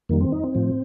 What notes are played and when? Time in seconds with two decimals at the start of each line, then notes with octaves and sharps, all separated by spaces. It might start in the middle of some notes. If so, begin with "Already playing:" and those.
0.09 F2 D#3 G3 A#3
0.21 C4
0.32 D#4
0.43 C4
0.55 A2 F3